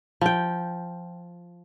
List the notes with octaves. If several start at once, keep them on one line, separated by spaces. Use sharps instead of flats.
F3 G5